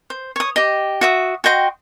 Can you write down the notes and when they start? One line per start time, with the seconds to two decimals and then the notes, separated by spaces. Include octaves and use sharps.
0.10 C5
0.36 C#5 D#6
0.56 G4 D#5
1.01 F#4 E5 D#6
1.44 F#4 D#5 G5 C6